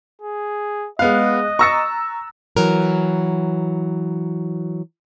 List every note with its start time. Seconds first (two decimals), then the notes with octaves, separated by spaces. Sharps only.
0.22 G#4
0.99 G#3 B3 D#5 F5 F#6
1.59 A#5 C#6 E6 A6 A#6 C#7
2.57 E3 F#3 A#4